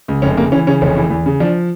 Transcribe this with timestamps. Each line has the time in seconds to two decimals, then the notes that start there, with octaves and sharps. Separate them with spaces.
0.08 C#2
0.22 F1 C#4
0.37 C#3 A#3
0.52 E3 C#4
0.67 C#3 C#4
0.81 F1 C#4
0.96 E3
1.10 E2
1.26 C#3
1.40 F3 D4